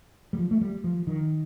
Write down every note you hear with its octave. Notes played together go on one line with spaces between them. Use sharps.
G3
F3
A3
G3
F3
D#3